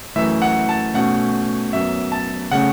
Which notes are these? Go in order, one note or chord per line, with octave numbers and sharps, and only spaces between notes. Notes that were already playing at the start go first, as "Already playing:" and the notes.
F#2 E3 A3 E5
F#5
A5
B2 A3 C#4 F#5
F#2 F#3 B3 E5
A5
C#3 A3 C#4 F#5